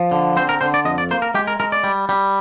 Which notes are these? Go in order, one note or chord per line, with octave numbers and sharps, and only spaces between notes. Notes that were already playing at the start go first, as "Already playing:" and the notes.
Already playing: F3
D3
C4 C5
A#4
D3 C5
D5
F2 D#5
D5
A#3 C5
A#4
G#3 G4
A#4
G#3 A#4
D5
G3
G3